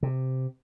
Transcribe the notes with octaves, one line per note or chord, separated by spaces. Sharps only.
C3